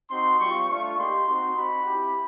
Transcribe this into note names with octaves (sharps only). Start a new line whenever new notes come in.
C4 D#4 F#4 C6
G3 C4 F4 C#6
A3 D4 F4 C#6
A#3 D#4 G4 C6
C4 D#4 F#4 C6
C4 D#4 F#4 B5
C4 E4 G4